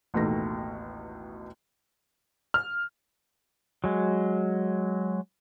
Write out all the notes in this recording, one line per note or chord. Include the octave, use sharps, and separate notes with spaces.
A1 D#2 B2 A3 D#4 A#6
F6
F#3 G#3